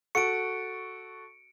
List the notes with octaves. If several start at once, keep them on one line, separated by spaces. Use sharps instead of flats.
F#4 A4 C#6 C#7 D7